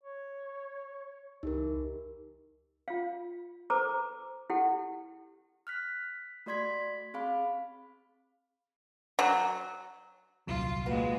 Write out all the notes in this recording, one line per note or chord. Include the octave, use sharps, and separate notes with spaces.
C#5
C#2 E3 D#4 G4 A#4
F4 F5
A4 B4 C5 A#5 D6
E4 G4 A4 F#5
F6 F#6 B6
A3 F#4 D5 C6 G#6 B6
C4 G#4 F5 B5
F#3
D#1 C2 F#3 F4
A#2 G#3 F4 F#4 B4